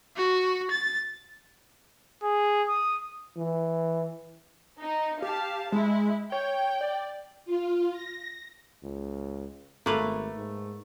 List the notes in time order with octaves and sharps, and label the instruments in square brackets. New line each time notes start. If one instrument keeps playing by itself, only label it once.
[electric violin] F#4
A6
[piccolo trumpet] G#4
D#6
[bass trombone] E3
[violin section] D#4
[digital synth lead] G4 [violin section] F5 A5
[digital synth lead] G#3 [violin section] E4
[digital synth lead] C#5 [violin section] G5
[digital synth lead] D5
[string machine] F4
A#6
[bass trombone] C#2
[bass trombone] G#1 [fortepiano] A3 [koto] A#3 B4 F5
[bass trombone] G#2